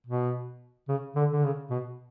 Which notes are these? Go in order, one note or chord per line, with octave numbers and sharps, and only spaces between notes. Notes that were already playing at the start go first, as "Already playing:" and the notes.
B2
C#3
D3
D3
C#3
B2